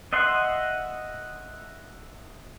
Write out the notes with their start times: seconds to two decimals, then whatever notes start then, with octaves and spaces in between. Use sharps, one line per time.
0.13 D#5 E5 F#5 C6